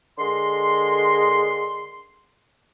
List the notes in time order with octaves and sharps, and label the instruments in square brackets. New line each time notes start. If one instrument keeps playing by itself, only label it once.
[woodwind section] D3 G#3 A#4 C6